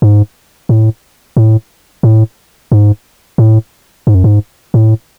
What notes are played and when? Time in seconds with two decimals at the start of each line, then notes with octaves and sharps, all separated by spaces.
0.02 G#2
0.69 A2
1.37 A2
2.03 A2
2.72 G#2
3.38 A2
4.07 G#2
4.15 F#2
4.24 G#2
4.74 A2